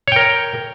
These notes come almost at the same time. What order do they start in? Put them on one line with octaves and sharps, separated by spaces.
C#5 G5 A#4